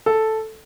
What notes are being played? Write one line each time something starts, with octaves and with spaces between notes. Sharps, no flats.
A4